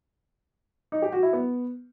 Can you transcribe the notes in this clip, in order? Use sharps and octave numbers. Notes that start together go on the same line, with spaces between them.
D#4
G4
F#4
E4
B3